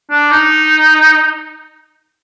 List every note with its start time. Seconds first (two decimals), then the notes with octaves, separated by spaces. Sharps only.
0.10 D4
0.31 D#4